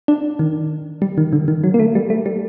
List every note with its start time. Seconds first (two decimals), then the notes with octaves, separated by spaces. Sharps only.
0.08 D4
0.39 D#3
1.02 G3
1.18 D#3
1.33 D3
1.48 D#3
1.64 F#3
1.74 A#3
1.80 A3
1.95 G3
2.10 A3
2.26 G3